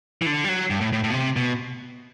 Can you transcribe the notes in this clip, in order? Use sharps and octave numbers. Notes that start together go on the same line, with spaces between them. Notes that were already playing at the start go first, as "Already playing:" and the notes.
E3
D3
G3
F#3
G2
A2
A2
A2
B2
C3
B2